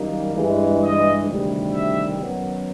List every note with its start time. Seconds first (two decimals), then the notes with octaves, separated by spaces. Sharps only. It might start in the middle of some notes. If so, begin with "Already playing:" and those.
Already playing: F#2 D#3 G3 A#3 D#4
0.35 G2 E3 G#3
0.82 D#5
1.27 D2 C3 D#3 G3
1.72 E5
2.19 F#2 D#3 F#3 B3